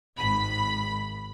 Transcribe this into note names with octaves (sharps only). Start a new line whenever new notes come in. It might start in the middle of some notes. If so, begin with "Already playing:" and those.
G#1 B5